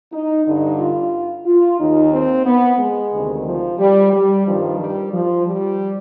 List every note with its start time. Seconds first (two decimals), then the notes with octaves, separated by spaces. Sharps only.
0.12 D#4
0.46 G2 D3 D#4
0.78 F4
1.45 F4
1.79 D#2 D#3 D#4
2.13 C4
2.46 B3
2.78 G#3
3.13 D2 C3 D#3
3.46 F3
3.79 G3
4.13 G3
4.46 G2 D#3 F3
4.80 G3
5.13 F3
5.46 G3